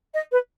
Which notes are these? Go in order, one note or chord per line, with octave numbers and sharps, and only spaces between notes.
D#5
B4